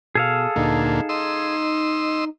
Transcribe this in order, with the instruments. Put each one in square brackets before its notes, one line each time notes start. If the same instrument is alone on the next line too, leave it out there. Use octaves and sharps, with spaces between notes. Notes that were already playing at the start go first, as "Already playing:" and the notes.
[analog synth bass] B2 [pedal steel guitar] G#4 A4 F5
[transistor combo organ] D2 A#2 [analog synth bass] D#4
[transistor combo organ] D#5 C6 E6